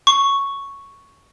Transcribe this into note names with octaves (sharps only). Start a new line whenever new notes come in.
C#6